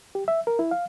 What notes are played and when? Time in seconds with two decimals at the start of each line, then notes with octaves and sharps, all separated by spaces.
0.15 G4
0.28 E5
0.47 A#4
0.59 E4
0.71 F5